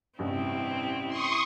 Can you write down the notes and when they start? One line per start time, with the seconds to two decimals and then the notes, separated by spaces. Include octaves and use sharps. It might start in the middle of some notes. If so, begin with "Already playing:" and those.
0.19 A1 G2 C3 C4 E4
1.08 C6 C#6 D#6